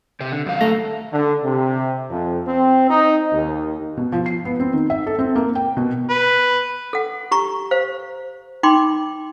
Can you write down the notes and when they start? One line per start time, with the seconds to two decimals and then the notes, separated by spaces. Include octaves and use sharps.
0.21 C3 C4
0.32 D3
0.46 F#2 D#3 F5
0.61 A3 A#5
1.13 D3
1.43 C3
2.09 F2
2.46 C4
2.89 D#4
3.33 D#2
3.97 B2
4.12 F3
4.26 C7
4.45 B3
4.60 C4
4.73 D#3
4.90 E5
5.07 A4
5.19 C4
5.35 A#3
5.55 G5
5.77 B2
6.10 B4
6.93 A4 F#5
7.31 G4 A#5 C#6
7.71 C5 F5
8.63 D#4 G5 B5 C6 D6